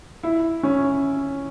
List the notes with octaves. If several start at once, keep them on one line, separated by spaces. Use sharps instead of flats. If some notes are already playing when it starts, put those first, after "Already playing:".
E4
C#4